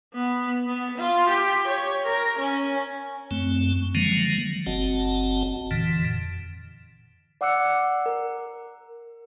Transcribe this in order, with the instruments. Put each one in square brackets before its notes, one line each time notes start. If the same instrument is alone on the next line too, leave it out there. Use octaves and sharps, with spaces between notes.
[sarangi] B3
B3
F4
G4
C#5
A#4
C#4
[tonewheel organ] F#2 A3 C4
D3 D#3 F3 F#3 G#3 A#3
F#1 C4 F#4 D#5 F#5 A5
F2 A#2 D3 E3
[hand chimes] D5 F#5 D6 E6 F#6 C#7
F#5
A#4